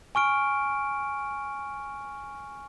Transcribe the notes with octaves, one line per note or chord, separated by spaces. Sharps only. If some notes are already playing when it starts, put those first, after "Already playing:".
G#5 C#6 F6 D7